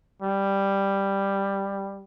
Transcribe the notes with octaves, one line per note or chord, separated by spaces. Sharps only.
G3